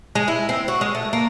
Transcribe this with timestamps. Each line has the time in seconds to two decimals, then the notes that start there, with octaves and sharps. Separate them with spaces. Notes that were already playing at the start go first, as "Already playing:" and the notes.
0.15 G#3
0.28 E4
0.49 C4
0.68 F#4
0.81 G#3
0.95 A3
1.13 A#3